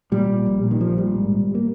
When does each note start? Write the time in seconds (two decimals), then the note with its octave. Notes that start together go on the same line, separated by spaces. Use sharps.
0.12 A#2 G3
0.29 A#2
0.46 A#1
0.63 A#2
0.71 D#3
0.80 A#1 F3
0.98 A#2 G3
1.15 G#2
1.32 G#1
1.55 A#3